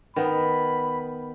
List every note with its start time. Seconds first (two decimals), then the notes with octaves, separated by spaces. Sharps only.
0.16 D#3 B3 B5